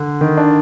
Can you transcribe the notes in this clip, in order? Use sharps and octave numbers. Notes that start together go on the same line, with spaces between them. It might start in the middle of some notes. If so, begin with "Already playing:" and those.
Already playing: D3
D#3
D4